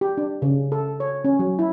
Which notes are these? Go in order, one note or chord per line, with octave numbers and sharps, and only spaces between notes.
G4
D4
C#3
A4
C#5
C#4
F#3
E4